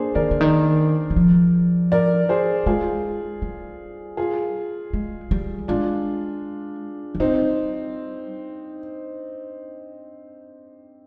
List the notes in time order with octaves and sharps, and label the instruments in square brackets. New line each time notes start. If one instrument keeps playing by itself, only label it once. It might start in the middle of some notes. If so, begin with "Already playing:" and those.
Already playing: [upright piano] A#3 D4 G#4 C5
[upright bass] D#3 [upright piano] A#4 D5
[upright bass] D3
D#3
D#3
F3
[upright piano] A#4 D5
G#4 C5
[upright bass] G#3 [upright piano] F4 G#4
[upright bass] G3
[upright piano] F4 G#4
[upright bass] G#3
G3
[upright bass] G#3 [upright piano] D4 F4
[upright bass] F3
[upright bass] G3 [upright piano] C4 D#4